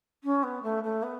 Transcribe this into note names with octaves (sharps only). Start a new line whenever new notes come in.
C#4
B3
A3
A3
B3